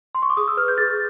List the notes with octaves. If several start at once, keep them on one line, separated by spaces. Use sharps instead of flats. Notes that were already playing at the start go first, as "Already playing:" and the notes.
C6
C#6
D6
G#4 D#6
E6
B4 F6
G6
G#4 A6